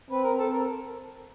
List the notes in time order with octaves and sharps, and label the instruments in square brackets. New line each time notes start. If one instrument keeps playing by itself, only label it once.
[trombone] C4 [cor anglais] B4
[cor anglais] A#4
A4
A#4